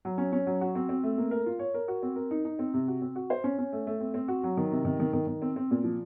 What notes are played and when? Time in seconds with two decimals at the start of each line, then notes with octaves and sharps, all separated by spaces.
0.05 F#3
0.18 C#4
0.32 C#4
0.47 F#3
0.61 F#4
0.75 C4
0.89 C4
1.03 A3
1.18 A#3
1.31 A#4
1.46 F4
1.59 C#5
1.74 A#4
1.88 F#4
2.03 C4
2.16 A#4
2.31 D#4
2.45 D#4
2.59 C4
2.74 C3
2.88 F#4
3.02 C4
3.16 F#4
3.30 C5
3.44 C#4
3.58 C#4
3.73 A3
3.87 A3
4.00 C4
4.14 C4
4.28 F#4
4.43 F#3
4.57 D#3
4.72 C3
4.85 D#3
5.00 D#3
5.13 D#3
5.27 D#3
5.42 C4
5.56 C4
5.71 A#2
5.84 F3